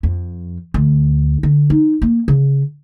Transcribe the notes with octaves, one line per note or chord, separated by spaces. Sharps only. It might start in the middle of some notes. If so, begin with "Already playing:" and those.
F2
D2
D3
D#4
A#3
C#3